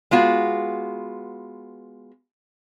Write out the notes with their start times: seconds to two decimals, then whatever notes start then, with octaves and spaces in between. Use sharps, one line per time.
0.11 G#3 B3 F4 F#4